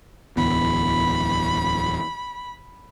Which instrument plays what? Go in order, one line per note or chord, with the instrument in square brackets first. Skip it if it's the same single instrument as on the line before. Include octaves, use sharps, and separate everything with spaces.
[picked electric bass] D1 E2 B3 [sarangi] B5